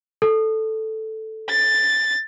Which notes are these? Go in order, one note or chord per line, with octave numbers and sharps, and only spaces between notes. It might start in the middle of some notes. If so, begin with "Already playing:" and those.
A4
A6